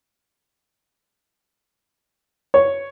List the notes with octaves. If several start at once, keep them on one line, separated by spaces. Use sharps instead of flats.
C#5